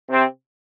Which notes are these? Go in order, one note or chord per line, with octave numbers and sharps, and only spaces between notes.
C3 C4